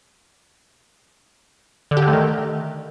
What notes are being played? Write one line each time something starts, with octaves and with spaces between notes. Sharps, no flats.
D3
G4
D3
A3
D#3